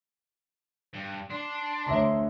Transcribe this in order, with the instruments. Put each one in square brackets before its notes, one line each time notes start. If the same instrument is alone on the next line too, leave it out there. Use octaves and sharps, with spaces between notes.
[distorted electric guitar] G2
[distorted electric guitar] D4 [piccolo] C6
[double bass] D2 [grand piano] C#5 E5 A#5